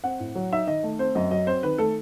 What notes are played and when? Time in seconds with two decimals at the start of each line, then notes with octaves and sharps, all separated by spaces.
0.04 C4 F#5
0.20 A2
0.35 F#3
0.52 D#4 E5
0.67 D#3 D#5
0.83 A3
0.99 C4 C5
1.15 F#2 D#5
1.31 F#3 D#5
1.47 C4 C5
1.63 D#3 B4
1.78 A3 A4